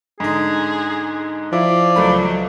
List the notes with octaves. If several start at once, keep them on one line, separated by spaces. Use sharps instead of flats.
G#2 D3 D#4 G#4
F3 E4 D5
C#2 F#3 A3 B5